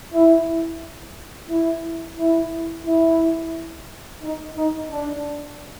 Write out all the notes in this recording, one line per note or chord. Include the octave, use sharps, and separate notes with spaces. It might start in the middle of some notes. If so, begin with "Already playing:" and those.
E4
E4
E4
E4
D#4
D#4
D4